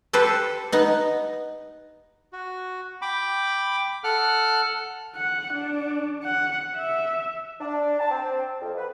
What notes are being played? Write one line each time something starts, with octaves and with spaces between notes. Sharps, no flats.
G4 A4 B4 C5
B3 D#4
F#4
G5 B5 D6
A4 F#5 F6 F#6
F#5
D4
F#5
E5
D4
A5
C4
F2
B4